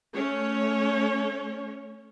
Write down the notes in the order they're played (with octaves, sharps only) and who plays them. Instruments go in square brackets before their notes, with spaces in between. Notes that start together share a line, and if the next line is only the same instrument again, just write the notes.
[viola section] A3 C#4 C#5